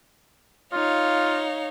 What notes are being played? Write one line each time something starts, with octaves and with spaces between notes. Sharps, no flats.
D#4 F4 C#5 F5